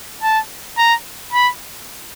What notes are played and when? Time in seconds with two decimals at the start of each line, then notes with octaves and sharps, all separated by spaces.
0.23 A5
0.78 A#5
1.33 B5